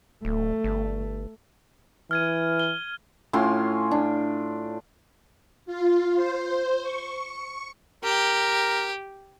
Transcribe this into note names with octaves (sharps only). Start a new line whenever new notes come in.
D1 A3
G1
E3 F6 G#6 D#7
G7
A2 C#4 F4 C6
D4
F4
C5
C#6
G4 A#4